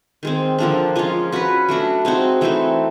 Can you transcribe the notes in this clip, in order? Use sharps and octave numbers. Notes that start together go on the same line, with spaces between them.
D#3 G#3 C4
D3 F3 A#3 D4
F3 G#3 C#4 F4
C#4 F#4 B4
F#3 A3 D4 F#4
G#3 C4 D#4 F#4
E3 A3 C4 D#4